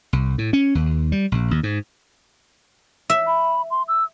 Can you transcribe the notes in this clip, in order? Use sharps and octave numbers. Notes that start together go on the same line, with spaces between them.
C2
A2
C#4
D#2
G3
A#1
D#2
G#2
E5
B5
C6
E6